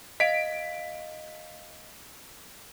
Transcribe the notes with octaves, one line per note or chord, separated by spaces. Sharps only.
D#5 F5 B6 D7